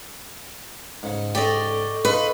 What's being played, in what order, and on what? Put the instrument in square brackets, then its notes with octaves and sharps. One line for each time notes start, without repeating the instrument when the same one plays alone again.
[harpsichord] G#2 C#3
[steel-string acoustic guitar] G4 D5 D#5 [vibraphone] A4 C#6
[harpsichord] D#4 F4 D#5 [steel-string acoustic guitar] B4